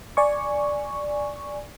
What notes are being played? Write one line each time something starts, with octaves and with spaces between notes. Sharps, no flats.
D5 G#5 C#6